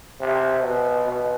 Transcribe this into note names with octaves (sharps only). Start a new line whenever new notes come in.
C3
B2
B2